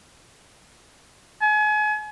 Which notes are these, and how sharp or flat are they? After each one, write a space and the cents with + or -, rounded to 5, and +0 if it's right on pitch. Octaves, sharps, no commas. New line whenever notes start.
G#5 +35